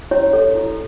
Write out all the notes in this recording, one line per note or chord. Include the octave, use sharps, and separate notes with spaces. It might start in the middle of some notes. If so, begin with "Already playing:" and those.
E4 C#5
A4 C#5
E4